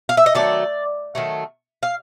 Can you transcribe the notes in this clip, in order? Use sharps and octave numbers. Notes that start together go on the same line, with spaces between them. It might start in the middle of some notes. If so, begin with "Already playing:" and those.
F5
E5
D#5
D#3 F#3 A3 D5
D#3 F#3 A3
F5